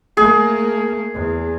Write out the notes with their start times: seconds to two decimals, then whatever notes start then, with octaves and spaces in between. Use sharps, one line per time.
0.17 A3 A#3 G#4
1.14 E2